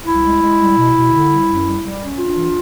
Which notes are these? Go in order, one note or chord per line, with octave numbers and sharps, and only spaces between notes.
C2 E4
G#3
G#3
G3
B2
B2
D3
G3
F#2
G3
G3
C#4
D4 F4
E3